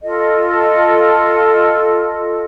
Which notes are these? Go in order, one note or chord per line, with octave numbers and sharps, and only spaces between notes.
F4 A4 D#5